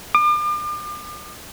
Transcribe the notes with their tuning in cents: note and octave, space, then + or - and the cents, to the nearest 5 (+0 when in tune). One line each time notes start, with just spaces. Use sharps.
D6 +40